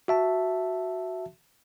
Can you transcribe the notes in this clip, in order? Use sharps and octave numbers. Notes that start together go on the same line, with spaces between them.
F#4 E5 A5